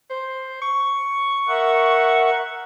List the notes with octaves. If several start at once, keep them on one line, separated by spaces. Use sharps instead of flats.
C5
C#6
A#4 E5 F#5